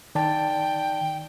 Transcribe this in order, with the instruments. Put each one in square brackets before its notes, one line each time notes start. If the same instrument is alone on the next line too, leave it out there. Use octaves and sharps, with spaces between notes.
[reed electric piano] D#3 D5 A5 [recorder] G5